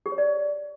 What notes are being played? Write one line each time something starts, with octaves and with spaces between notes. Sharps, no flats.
G4
C#5
D5